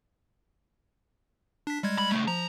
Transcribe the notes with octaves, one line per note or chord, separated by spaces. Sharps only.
D4 B6
G3 G#3 G#6
B5
C#3 A3
F3 A#5